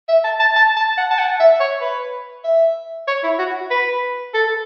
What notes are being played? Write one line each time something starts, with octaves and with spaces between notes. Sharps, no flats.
E5
A5
A5
A5
A5
F#5
A5
F#5
E5
C#5
B4
E5
C#5
E4
F#4
B4
A4